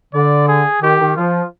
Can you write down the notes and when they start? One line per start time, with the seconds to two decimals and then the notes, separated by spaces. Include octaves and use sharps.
0.14 D3 D5
0.48 G#4
0.82 D#3 G4
1.00 D#3
1.16 F3 F4